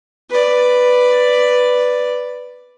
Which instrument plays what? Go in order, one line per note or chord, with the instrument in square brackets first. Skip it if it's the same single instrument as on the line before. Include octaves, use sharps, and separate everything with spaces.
[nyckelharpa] B4 D5